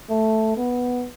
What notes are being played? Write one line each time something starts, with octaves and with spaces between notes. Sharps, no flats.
A3
B3